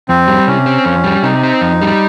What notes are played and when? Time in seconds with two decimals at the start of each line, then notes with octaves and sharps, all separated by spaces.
0.09 F2 C4
0.28 G3
0.47 C3 C#4
0.66 C4
0.85 F2
1.04 G3
1.23 C3 D#4
1.43 C4
1.61 F2
1.82 G3